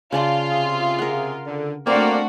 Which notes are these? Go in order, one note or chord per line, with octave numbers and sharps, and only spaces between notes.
C#3 F4 D5 A5
C3 G#4
A#4 F#5
D3
A3 A#3 C4 D4 F#4 D5